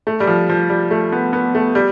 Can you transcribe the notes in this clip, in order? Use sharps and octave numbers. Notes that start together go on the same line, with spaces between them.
A3
G3
F3
F3
G3
A3
B3
B3
A3
G3